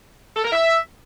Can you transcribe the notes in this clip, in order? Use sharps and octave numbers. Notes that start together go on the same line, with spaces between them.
A4
A#4
E5